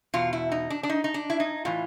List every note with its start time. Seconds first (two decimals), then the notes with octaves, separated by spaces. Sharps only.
0.14 E2 B2 F4
0.33 E4
0.52 D#4
0.70 D4
0.83 D4
0.89 D#4
1.04 D#4
1.14 D4
1.30 E4
1.40 D#4
1.65 A2 E3 F4